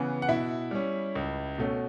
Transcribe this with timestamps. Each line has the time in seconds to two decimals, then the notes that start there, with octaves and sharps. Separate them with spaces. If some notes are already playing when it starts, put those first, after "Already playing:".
Already playing: C#3 E3 B3
0.22 F#5
0.28 B2 E4 E5
0.71 G3 C#4
1.16 C#2
1.58 B2 A3 C#4